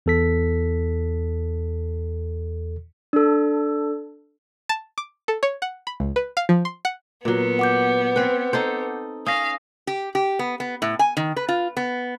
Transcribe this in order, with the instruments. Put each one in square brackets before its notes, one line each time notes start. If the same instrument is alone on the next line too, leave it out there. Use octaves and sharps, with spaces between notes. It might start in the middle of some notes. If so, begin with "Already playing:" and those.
[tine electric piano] E2 A4 B6
[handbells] D4 A4
[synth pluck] A5
D6
A4
C#5
F#5
B5
C#2
B4
F5
F3
C6
F#5
[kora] A#2 F#3 [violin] B3
[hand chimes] F#5 D6 G6
[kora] C4 B4
D#4 A4 C5
[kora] C#4 [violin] F5 [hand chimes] D#6 A#6
[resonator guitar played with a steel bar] G4
G4
B3
B3
A2
G#5
D#3
B4
F4
B3